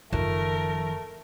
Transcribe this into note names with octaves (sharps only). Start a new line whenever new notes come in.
F#1 D#3 F3 A3 A#4